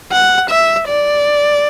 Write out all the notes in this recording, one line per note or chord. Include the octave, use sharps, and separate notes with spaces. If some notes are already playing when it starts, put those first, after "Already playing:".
F#5
E5
D5